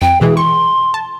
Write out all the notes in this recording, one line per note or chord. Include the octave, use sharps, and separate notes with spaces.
F2 G5
B2 E3 G#3 G#4
C6 C#6
A5